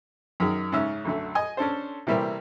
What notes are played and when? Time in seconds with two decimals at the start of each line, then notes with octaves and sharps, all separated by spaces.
0.40 F#2 D#3 G#4
0.72 G#2 C#3 C#4 E5
1.05 B1 F#2 D3 A3
1.35 D#5 G#5
1.57 C#4 D4 A4 C5
2.07 C3 E3 G3 A3 A#3 C4